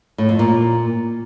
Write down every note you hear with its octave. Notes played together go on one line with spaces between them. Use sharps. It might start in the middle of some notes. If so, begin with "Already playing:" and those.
A2
F2
A#2